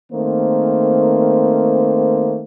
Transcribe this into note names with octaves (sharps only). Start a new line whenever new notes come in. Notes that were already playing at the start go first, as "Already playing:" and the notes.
D#3 A3 A#3 C4 C5